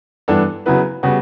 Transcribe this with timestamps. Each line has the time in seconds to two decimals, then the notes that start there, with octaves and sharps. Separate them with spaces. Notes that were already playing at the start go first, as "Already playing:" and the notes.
0.28 G2 E3 B3 D4 A4
0.66 C#3 F#3 B3 E4 B4
1.03 C#3 G3 B3 F#4